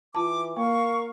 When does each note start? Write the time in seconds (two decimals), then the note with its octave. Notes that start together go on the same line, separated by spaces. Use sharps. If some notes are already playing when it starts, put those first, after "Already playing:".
0.15 E3 F4 A5 D6
0.57 A#3 A#4 F5 C#6